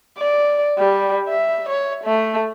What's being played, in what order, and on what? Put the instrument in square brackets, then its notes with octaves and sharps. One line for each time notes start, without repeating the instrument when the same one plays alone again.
[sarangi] D5
G3
E5
C#5
A3